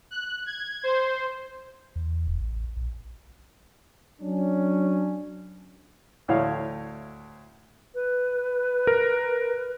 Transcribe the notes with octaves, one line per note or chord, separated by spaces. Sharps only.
F#6
G#6
C5
E2
E1
A1
A#1
F#3 C#4 D4
D2 A2 C#5 F5
B4
A#4